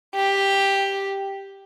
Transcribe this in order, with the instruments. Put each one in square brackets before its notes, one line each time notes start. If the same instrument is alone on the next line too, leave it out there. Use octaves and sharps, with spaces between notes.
[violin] G4